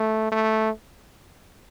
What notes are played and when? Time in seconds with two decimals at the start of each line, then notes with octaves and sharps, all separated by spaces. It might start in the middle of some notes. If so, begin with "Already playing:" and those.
Already playing: A3
0.32 A3